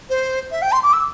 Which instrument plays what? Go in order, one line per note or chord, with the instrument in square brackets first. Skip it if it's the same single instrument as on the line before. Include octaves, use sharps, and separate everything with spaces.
[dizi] C5
E5
G5
C6
D6
E6